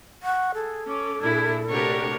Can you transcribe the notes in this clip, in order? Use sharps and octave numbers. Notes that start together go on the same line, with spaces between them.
F#5 C#6
G#4 A4
C#4 D6
A#2 D4 E4 G#4 G#6
C3 A3 D4 F#4 G4 A#4 C#5